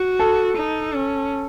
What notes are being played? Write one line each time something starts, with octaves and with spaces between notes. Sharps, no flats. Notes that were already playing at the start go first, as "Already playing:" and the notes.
Already playing: F#4
A4
D#4
C#4